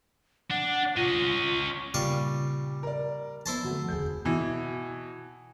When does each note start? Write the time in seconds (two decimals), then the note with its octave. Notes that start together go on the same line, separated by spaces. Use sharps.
0.50 D4 F#5
0.96 C#4 F4 D#5
1.94 A#2 C#3 G3 F5 C#6
2.83 A#4 D5
3.46 F3 B3 E4 C5 A5
3.64 D3 F3 A3 C4 F#4
3.88 E1 D2 G#4 G6
4.25 B2 E3